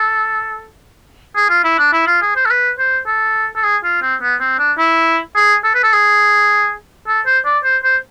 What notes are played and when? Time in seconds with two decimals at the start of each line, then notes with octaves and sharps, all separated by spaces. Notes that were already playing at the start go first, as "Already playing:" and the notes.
Already playing: A4
1.36 G#4
1.50 F4
1.64 E4
1.79 D4
1.93 E4
2.07 F4
2.22 G#4
2.36 C5
2.45 A4
2.50 B4
2.78 C5
3.07 A4
3.56 A4
3.64 G#4
3.84 F4
4.02 C4
4.22 B3
4.40 C4
4.59 D4
4.78 E4
5.36 G#4
5.64 A4
5.74 B4
5.83 A4
5.93 G#4
7.07 A4
7.26 C5
7.45 D5
7.64 C5
7.83 C5